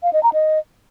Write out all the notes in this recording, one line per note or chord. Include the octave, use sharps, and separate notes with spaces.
F5
D#5
A#5
D#5